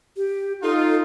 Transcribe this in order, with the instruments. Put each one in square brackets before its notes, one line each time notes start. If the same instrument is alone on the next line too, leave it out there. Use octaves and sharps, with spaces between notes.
[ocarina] G4
[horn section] D#4 F4 [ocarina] A4